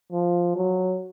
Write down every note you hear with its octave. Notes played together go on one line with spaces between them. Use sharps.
F3
F#3